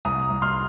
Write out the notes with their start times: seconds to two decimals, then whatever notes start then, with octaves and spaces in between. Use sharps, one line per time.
0.05 C2 A#5 D#6
0.30 C2
0.42 C6 F6